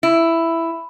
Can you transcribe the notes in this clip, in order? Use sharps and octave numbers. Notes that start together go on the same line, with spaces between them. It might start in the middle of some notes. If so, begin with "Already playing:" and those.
E4